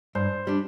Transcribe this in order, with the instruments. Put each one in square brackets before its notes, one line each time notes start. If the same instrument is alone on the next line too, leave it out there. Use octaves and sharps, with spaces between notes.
[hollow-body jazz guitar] G2 [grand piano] C5
[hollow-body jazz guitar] G3 D4